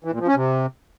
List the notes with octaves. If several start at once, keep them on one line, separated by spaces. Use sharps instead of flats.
E3
A#2
F3
C#4
C3